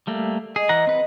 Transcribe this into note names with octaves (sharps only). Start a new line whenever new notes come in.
G3 A3 A#3
G#4 D#5
E3 F#5 A#5
C4 B4 F#5